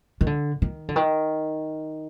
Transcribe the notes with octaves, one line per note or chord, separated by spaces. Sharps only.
D#3
D3
D#3
D3
D#3